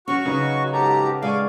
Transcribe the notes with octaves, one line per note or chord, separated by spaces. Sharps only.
F#3 C#4 F#4 C#6
C#3 D#4 B4 C#5
G#2 G4 A4 F#5 A#5
G#3 D5 F5 G#5 C#6